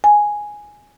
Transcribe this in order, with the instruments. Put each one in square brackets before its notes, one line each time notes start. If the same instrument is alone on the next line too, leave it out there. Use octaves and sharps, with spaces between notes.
[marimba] G#5